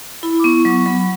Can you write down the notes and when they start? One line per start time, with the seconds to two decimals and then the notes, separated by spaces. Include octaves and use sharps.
0.23 E4 B5
0.39 D6
0.44 B3 C#6
0.65 F#3 C#6
0.86 F#3 B5